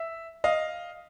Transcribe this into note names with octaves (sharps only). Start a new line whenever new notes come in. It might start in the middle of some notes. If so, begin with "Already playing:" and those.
Already playing: E5
D#5 F5